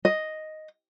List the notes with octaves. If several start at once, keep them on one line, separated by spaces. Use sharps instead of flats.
D#5